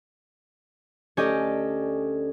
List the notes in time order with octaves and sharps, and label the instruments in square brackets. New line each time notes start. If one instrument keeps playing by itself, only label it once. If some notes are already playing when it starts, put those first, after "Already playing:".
[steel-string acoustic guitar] D2 A4 D5 [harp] C#4 G4 D#5